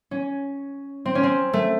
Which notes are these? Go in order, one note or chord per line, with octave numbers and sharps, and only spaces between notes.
C#4
C4
C#4
C4
A3